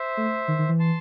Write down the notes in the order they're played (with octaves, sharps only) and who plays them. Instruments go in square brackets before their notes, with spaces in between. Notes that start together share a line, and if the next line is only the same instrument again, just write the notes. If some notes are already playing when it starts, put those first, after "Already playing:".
Already playing: [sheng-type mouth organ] C5 E5
[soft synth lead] A3
D#3
D#3
E3
[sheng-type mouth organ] A5 C6